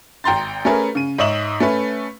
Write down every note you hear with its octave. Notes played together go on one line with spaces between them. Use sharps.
G#1 G5 A#5 C6 A6
A3 C#4 G#4 A#4 B4
C#3 D#7
G#2 C#5 D#5 E5 E7 F#7
A3 C#4 B4